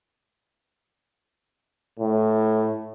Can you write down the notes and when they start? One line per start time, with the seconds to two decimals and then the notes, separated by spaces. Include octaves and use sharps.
1.99 A2